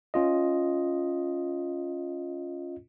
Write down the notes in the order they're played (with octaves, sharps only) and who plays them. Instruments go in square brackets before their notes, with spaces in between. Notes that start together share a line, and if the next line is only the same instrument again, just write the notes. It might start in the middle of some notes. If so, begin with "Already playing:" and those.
[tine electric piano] C#4 F4 D#5